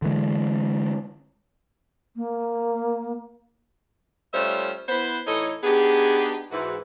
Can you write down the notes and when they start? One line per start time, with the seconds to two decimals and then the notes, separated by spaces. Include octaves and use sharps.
0.02 D3 E3 G#3
2.16 A#3
4.33 G3 A3 C#4 F4 C5 E5
4.88 B3 E4 B4 C5
5.26 A2 E3 D#4 A4 C#5 D#5
5.63 B3 D4 D#4 G4 G#4
6.50 G#2 E3 F#4